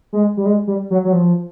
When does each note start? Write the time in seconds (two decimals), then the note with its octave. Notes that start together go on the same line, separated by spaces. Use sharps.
0.13 G#3
0.37 G3
0.46 G#3
0.67 G3
0.90 F#3
1.04 F#3
1.12 F3